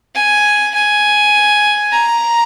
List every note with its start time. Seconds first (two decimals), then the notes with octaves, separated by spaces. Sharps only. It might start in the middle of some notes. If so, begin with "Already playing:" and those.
0.16 G#5
0.75 G#5
1.92 A#5